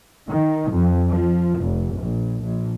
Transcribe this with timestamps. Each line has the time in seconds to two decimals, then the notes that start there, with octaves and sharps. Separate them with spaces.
0.29 D#3
0.71 F2
1.09 F3
1.62 F1
1.98 A#1
2.43 A#1